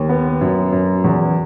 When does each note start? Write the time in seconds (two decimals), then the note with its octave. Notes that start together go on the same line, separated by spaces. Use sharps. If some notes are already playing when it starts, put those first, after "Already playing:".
Already playing: D#2
0.09 B3
0.41 F#2
0.72 F#2
1.04 E2